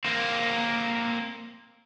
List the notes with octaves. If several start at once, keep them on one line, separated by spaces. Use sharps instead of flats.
A#3 C4